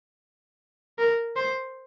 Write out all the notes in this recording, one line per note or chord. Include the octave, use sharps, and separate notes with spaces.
A#4
C5